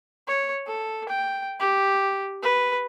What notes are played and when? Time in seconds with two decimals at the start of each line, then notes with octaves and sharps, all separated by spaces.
0.27 C#5
0.67 A4
1.09 G5
1.60 G4
2.43 B4